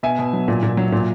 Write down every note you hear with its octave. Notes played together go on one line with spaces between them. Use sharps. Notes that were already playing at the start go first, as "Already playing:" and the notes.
B2 E5 G#5
B2
F#3
A#2
A#2
F#3
A#2